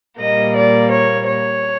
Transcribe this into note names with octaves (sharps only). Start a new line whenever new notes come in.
A#2 G3 A#3 D#5
D5
C#5
C#5